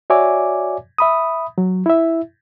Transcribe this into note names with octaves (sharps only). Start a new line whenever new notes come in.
F#4 C#5 D5 E5 G#5 D6
E5 B5 D#6
F#3
E4 E5